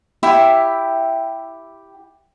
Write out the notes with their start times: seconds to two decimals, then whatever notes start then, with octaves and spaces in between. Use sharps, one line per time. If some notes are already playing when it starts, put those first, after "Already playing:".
0.23 E4 G4 E5 G5